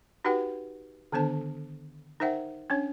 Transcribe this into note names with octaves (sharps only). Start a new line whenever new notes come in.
D#4 F#4 G4 B4 F#5 G5
D3 D#3 B3 D4 C5 A5
D#4 A#4 C5 E5 F#5 G5
C#4 D4 C#5